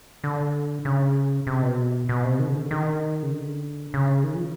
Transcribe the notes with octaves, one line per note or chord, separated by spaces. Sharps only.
D3
C#3
C3
B2
B2
C3
D#3
C#3
D3
D#3
C#3
D3
C#3
D#3
F3